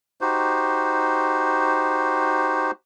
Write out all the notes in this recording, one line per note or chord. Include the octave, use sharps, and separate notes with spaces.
D#4 F#4 G4 C5